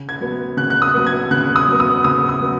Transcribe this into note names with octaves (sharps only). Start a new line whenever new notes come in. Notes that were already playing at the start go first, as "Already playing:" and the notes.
Already playing: C#3
G#6
F#3 B3
C#3 F#6
F#6
D#6
F#3 B3
G#6
C#3 F#6
D#6
F#3 B3
D#6
C#3 D#6
D#6
F#3 B3